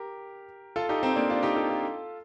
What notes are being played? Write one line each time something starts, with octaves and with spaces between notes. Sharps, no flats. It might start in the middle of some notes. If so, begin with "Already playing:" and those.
Already playing: G4 A#4
F4 A4
D#4 G4
C4 D#4
A#3 D4
D4 F4
D#4 G4
F4 A4
F4 A4